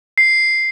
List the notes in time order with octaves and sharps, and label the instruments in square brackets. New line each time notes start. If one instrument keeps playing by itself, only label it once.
[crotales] C7